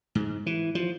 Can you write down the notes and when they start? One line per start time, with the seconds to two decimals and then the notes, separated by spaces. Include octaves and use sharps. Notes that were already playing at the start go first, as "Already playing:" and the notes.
0.15 G#2
0.46 E3
0.75 F3